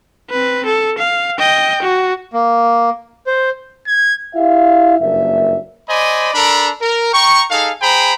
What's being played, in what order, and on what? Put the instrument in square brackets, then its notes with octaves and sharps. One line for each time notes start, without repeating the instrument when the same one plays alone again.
[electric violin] C4 B4
A4
F5
D#5 G5
F#4
[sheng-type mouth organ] A#3
C5
[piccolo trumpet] G#6
[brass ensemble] E4 G4 E5 F5
F#1 G2 A#3 E5
[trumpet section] C5 D5 D#5 G#5 B5
D4 A4 A#4 A#5 B5
A#4
G5 A#5 C#6
D#4 G#4 A4 F5
G#4 C5 G5 A#5 B5